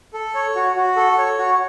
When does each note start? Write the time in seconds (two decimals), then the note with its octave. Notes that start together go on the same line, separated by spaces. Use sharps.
0.14 A4
0.35 C#5
0.56 F#4
0.76 F#4
0.96 A4
1.18 C#5
1.38 F#4